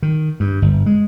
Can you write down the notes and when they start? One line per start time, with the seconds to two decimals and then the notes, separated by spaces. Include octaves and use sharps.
0.03 D#3
0.40 G2
0.62 G1
0.86 G#3